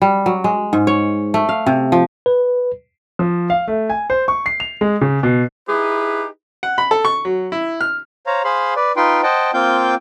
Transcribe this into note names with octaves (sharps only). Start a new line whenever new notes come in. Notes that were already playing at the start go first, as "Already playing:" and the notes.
G3
F#3
G#3
G#2
C#5
A3
F5
C3
F3
B4
F3
F5
A3
G#5
C5
C#6
C7
F7
G#3
C#3
B2
D#4 E4 G4 G#4 B4
F#5
B5
A4
C#6
F#3
E4
F6
C5 C#5 F5 A#5
G#4 C5 F5 B5 C6
B4 D5
D#4 F4 B4 G5 C6
C5 D#5 F#5 G5 A5
A#3 C4 F4 F5 G5 G6